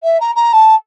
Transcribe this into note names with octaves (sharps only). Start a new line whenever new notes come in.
E5
A#5
A#5
A5